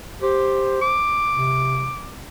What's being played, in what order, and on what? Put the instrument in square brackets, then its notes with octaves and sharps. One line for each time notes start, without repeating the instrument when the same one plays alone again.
[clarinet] G4 [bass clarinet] C5
[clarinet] D6
[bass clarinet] C3